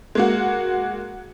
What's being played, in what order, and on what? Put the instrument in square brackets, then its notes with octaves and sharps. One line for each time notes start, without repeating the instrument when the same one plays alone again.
[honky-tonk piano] G#3 A#3 F#4